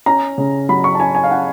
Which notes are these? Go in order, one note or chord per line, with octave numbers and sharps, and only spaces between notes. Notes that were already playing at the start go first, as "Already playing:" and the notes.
C#4 A#5
C#3
F#3 B5
C#6
A5
C#4 G#5
G#5
F5
C#4 F#5